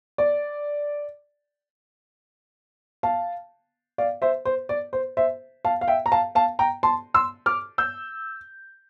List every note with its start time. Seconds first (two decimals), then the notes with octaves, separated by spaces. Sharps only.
0.18 D5
3.03 F5 A5
3.98 D5 F5
4.22 C5 E5
4.45 C5
4.69 D5
4.93 C5
5.17 C5 E5
5.65 F5 A5
5.81 F5
5.88 E5 G5
6.06 A#5
6.12 F5 A5
6.35 F5 A5
6.59 G5 A#5
6.83 A5 C6
7.14 C6 E6
7.46 D6 F6
7.78 E6 G6